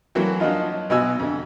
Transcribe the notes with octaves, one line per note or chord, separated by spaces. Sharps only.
E3 F#3 A3 A#3 C4 F#4
F3 F#3 D4 D#4 F4
B1 B2 D#4 F#4 G#5 E6
F2 D3